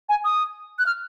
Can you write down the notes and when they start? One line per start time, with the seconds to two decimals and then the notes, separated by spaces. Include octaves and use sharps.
0.09 G#5
0.25 D#6
0.79 F#6
0.86 F6